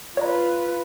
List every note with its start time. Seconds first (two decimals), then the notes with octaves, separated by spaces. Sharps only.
0.17 F4 B4 C#5 D5 A#5